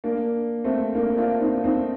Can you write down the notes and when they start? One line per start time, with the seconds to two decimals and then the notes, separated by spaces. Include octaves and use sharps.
0.04 A#3 D4
0.64 A3 C4
0.95 A#3 D4
1.17 D4 F4
1.40 C4 D#4
1.64 C4 D#4